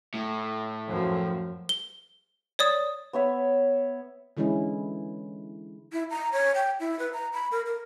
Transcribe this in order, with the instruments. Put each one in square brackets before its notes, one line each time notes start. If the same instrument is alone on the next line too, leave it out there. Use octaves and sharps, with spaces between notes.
[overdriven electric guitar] A2
[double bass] F#2 F3
[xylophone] G7
C#5 D5 D#6
[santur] B3 C#5 E5
[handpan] D3 E3 G#3 C#4 E4
[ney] E4
A#5
C#5
G5
E4
B4
A#5
B5
A#4
A#4